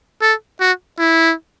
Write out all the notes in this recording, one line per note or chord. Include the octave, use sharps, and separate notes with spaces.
A4
F#4
E4